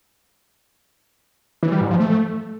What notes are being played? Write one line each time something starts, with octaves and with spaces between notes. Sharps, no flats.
E3
G3
G#2
F3
A3